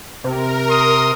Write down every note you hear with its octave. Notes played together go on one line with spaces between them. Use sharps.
C3 A#4
C6 D#6